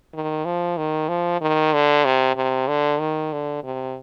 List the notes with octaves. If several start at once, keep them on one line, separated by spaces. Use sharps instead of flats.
D#3
F3
D#3
F3
D#3
D3
C3
C3
D3
D#3
D3
C3